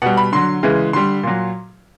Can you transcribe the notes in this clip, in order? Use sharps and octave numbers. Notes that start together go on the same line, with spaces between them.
B2 G3 F#5
B5
D3 F#3 C6
C#3 E3 G#3
D3 G3 C6
A#2 F#3